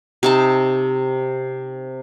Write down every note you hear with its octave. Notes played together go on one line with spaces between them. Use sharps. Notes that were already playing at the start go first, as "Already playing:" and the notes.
C3 D#4 A5